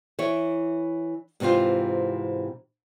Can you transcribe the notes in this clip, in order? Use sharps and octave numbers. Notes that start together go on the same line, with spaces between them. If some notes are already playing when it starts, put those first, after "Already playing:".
E3 E4 C#5
G#2 C3 E3 C4 F4